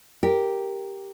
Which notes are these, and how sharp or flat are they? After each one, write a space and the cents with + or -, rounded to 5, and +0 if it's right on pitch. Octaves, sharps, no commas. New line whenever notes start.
G4 +0 A#4 +0